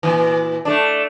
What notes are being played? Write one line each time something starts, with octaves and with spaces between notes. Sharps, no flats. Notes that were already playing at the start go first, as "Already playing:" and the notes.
A#2 E3
A3 D4